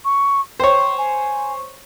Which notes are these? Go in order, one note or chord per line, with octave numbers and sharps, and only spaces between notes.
C#6
C5 C#5 G5
G#5